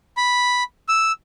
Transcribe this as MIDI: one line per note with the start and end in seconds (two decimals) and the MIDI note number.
0.17 0.63 83
0.89 1.12 88